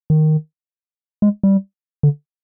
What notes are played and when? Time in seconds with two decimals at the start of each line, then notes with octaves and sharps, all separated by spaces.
0.10 D#3
1.22 G#3
1.43 G3
2.03 D3